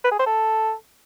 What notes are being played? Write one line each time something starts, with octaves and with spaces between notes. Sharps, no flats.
B4
G#4
C5
A4